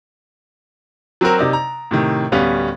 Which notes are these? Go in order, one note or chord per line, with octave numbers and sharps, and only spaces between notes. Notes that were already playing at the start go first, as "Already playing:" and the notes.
F#3 C4 F#4 A#4
C3 D#4 D5
A#5
A2 C3 D#3
D1 G3 B3 C#4 F5